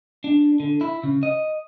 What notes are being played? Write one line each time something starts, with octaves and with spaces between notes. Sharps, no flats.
D4
D3
E4
C#3
D#5